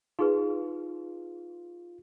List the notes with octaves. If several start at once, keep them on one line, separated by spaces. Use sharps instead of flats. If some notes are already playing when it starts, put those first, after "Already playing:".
D#4 F4 G#4 B4